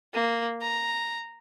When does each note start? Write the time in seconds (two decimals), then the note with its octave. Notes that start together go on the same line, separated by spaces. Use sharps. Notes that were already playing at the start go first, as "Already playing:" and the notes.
0.14 A#3
0.61 A#5